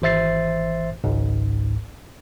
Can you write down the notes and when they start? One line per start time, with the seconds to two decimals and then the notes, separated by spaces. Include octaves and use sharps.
0.02 G#1 E3 C5 E5 A6 C7
1.04 G#1 C#2 G#2